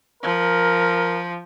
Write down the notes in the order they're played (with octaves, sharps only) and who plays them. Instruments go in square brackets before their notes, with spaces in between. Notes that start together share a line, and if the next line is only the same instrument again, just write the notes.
[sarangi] F3 [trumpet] A#4